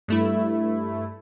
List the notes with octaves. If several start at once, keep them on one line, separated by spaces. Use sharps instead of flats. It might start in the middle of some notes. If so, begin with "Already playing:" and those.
G2 A3 E4